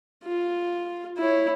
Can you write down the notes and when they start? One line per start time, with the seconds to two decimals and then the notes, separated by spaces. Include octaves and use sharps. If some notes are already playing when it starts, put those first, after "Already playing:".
0.24 F4
1.18 E4 C#5